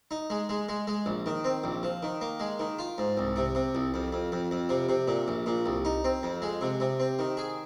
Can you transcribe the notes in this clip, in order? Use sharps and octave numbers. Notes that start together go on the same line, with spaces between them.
D#4
G#3
G#3
G#3
G#3
A#1
D#3
C4
A#1
F3
D#3
A#3
G#3
D#3
F4
G#2
C2
C3
C3
C2
F2
F2
F2
F2
C3
C3
A#2
A#1
A#2
C2
D#4
C4
F2
G#3
C3
C3
C4
D#3
G#4